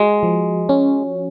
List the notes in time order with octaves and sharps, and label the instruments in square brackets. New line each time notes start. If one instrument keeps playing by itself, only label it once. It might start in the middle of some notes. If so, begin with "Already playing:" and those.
Already playing: [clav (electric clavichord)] G#3 [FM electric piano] F#4
[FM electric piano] F3
C#4